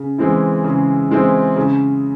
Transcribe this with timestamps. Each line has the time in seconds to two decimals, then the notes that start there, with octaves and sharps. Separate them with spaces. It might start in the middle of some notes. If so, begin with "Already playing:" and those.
Already playing: C#3
0.18 E3 G#3 C4 E4
0.64 C#3
1.10 E3 G#3 C4 E4
1.56 C#3